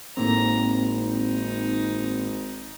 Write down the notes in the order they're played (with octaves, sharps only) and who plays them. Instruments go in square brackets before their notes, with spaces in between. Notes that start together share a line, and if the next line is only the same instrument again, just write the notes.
[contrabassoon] G#1 [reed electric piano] A2 A#3 C4 [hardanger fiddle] A#5
[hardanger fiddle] D#4